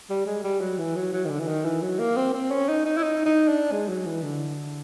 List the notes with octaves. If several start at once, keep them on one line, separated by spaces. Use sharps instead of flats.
G3
G#3
G3
F#3
E3
F#3
F#3
D#3
D3
E3
D#3
E3
F#3
A#3
C4
C4
C#4
D#4
D#4
E4
D#4
D#4
D4
G#3
F#3
E3
D3